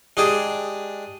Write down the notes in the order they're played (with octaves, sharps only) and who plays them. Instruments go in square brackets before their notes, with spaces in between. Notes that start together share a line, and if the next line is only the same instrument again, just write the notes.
[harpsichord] G#3 D4 G4 G#4